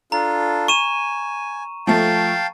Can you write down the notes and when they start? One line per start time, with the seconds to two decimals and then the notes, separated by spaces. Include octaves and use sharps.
0.12 D4 F4 A4 A#5
0.68 G#5 C#6 D#7 E7
1.87 F3 A3 F5 G5 A5